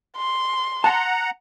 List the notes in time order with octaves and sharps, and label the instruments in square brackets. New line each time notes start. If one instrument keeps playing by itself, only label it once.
[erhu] C6
[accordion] F#5 A#5 [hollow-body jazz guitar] A5